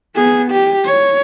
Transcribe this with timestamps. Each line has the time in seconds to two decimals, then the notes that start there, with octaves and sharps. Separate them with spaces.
0.16 B3 G#4
0.51 G4
0.84 C#5